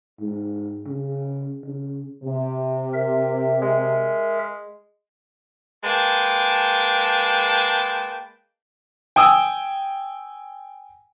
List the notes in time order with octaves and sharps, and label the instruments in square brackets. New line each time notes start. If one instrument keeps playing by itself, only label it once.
[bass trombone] G#2
C#3
C#3
[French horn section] C3
[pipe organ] A#4 E5
[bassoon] G#3
[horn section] G#3 A#3 B4 G5 A5
[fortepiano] G5 G#5 D#6 E6